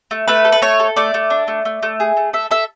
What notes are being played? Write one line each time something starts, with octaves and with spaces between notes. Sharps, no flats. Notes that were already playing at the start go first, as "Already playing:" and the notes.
A3
A3 B4
A4
B4
A3 C#5
A4
A3 D5
A3
D4
A3
A3
A3
G#4
A3
A4 E5
A4 E5